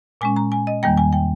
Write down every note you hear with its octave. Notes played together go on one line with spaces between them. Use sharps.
A#2 G#3 C#4 G#5
A#5
G#5
D#5
E2 D#3 G3 A#3 G5
G#5
G5